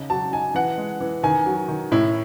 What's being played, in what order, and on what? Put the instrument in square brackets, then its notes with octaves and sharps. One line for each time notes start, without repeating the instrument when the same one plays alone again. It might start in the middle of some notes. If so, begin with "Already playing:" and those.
Already playing: [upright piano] C#3 D#4
F#3 A5
D#4 G#5
E3 F#5
G#3
E3
D#3 G#5
F#3
D#3
A2 E4